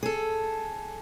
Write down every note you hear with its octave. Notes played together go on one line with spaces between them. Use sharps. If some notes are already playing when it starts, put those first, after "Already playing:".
G#4 A4